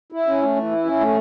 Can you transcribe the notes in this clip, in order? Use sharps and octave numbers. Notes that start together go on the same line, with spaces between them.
E4
C#4
A3
E3
E4
C#4
A3